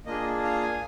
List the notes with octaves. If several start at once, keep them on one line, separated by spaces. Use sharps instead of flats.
A#3 D4 F4 G#4 D#5
F5
G#5